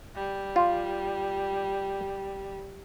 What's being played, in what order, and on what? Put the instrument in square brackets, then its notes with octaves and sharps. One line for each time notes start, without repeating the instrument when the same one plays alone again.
[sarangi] G3
[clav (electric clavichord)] F4